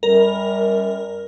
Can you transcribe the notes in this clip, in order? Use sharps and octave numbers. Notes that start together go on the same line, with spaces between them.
F#2 G3 A#4